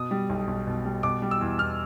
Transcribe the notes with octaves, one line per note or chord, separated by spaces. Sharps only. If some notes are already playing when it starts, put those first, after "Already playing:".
Already playing: B2 D#6
G3
B1
B1
B2
G3
B2 D6
G3
E6
E2
E2 F6